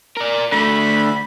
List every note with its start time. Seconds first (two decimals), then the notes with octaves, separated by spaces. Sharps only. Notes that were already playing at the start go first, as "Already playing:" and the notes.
0.17 A#4 D5
0.52 D3 A3 B5